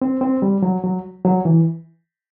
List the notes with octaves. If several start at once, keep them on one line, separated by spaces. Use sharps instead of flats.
C4
C4
G3
F#3
F#3
F#3
E3